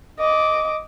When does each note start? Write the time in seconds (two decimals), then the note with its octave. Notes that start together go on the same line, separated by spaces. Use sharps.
0.19 D#5 D6